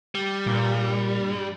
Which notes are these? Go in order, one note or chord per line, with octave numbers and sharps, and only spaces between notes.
G3
G2 A#2